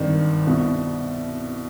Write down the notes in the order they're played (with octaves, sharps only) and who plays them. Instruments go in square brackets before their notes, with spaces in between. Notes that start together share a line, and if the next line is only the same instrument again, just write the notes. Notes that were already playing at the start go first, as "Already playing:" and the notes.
Already playing: [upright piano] G#1 G2 D#3 D4
C2 B2